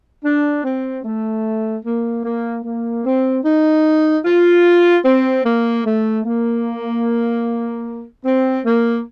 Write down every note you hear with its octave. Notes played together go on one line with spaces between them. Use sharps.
D4
C4
A3
A#3
A#3
A#3
C4
D#4
F4
C4
A#3
A3
A#3
C4
A#3